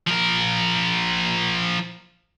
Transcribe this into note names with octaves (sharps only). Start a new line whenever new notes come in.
F3 A#4